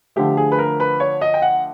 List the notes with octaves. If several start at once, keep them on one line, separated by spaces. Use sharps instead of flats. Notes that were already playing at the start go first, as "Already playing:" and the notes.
D3 F3 A3 G4
G#4
B4
A#4
B4
C#5
D#5
G5
F#5